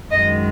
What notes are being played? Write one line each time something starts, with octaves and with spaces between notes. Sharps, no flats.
F#2 D#3 G#3 D#5